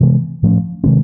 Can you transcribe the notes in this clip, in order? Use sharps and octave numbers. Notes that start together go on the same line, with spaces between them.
C3 E3 G#3 B3
A2 F3 A3 C#4
C3 D#3 G#3 C4